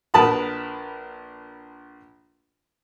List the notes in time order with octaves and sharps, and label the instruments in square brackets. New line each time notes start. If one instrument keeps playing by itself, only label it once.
[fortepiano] A#1 A#4 B4 A5 B5 D#6